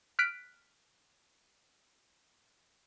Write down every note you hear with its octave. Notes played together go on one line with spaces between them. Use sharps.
F6 F#6 B6 D7